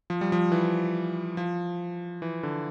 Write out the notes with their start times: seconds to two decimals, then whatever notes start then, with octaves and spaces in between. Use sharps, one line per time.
0.10 F3
0.21 G3
0.32 F3
0.52 E3
1.37 F3
2.22 E3
2.43 D3